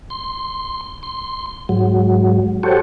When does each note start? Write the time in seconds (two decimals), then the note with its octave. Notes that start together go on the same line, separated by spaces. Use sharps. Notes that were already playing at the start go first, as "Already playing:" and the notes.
0.10 C6
1.03 C6
1.69 G#2 F#3
2.63 F#4 G4 A4 C5 C#5